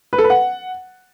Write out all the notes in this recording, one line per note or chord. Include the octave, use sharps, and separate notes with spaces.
B4
A4
B4
F#5